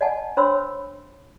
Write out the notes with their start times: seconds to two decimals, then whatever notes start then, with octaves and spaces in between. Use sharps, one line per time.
0.01 D5 D#5 F#5 G#5 A5
0.37 D4 C5 C#5 B5 C6 E6